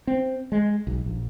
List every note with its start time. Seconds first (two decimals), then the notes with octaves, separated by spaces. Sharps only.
0.07 C4
0.52 G#3
0.87 B1
1.06 A#1